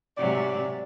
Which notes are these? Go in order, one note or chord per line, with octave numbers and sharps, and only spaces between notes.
G#2 C3 F#3 D5